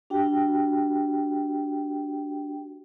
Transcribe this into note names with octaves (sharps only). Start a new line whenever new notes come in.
D4 F#4 G4 G5